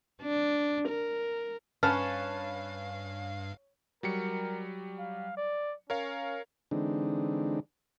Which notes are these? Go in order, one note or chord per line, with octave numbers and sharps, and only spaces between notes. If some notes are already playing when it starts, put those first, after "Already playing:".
D4
A#4
G2 C#4 B4 F5 A5 F6
F#3 G3 A#4 C#7
F5
D5
C#4 A#4 C#5 F5
D3 E3 G#3 C4 D4 D#4